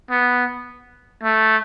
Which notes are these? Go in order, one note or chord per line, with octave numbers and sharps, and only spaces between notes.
B3
A3